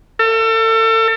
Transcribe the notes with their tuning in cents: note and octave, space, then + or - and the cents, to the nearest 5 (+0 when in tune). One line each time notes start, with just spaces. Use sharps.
A4 +35